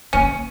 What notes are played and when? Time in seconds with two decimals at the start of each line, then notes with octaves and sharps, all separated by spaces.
0.13 A#3 C#4